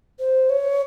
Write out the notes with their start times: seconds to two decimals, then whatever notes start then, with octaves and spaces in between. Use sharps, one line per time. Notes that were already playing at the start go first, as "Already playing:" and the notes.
0.20 C5
0.49 C#5